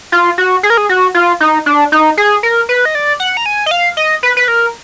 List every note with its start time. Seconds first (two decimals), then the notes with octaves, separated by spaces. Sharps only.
0.12 F4
0.38 F#4
0.63 G#4
0.70 A#4
0.77 G#4
0.89 F#4
1.14 F4
1.40 D#4
1.66 D4
1.92 D#4
2.17 G#4
2.43 A#4
2.69 B4
2.85 D#5
2.95 D5
3.20 F#5
3.37 A#5
3.46 G#5
3.66 D#5
3.71 F5
3.97 D#5
4.23 B4
4.37 B4
4.48 A#4